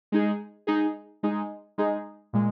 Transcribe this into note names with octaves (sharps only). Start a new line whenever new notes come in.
G#3 D#4 G#4
G#3 D#4 G#4
G#3 D#4 G#4
G#3 D#4 G#4
A#2 G#3